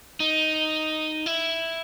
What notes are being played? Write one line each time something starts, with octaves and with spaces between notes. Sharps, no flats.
D#4
E4